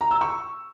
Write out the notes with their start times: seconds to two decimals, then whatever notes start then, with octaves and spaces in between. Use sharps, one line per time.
0.01 A#5
0.11 E6
0.21 C#6